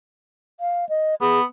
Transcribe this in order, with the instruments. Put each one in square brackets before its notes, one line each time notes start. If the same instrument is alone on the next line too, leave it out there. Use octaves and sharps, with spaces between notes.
[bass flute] F5
D#5
[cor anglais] B3 [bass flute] G#4